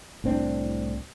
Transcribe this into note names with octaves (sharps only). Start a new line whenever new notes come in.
C2 A2 C4 D4